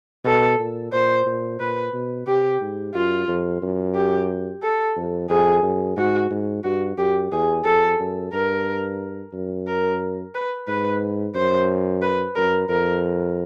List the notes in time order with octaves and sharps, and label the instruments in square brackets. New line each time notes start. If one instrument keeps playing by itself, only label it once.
[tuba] B2 [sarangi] A4
[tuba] A#2
[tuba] A#2 [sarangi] C5
[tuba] A#2
[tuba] A#2 [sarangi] B4
[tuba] B2
[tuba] C3 [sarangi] G4
[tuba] G#2
[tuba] F#2 [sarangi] F4
[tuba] F2
F#2
[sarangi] G4
A4
[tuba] F2
[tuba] F2 [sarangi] G#4
[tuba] F#2
[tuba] G#2 [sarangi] F#4
[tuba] G#2
[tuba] G2 [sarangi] F#4
[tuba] F#2 [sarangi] G4
[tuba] E2 [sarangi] G#4
[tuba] F2 [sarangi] A4
[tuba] F#2
[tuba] G2 [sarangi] A#4
[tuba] F#2
[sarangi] A#4
B4
[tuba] G#2 [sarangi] B4
[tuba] F#2 [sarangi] C5
[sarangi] B4
[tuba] F#2 [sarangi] A#4
[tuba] F2 [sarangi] A#4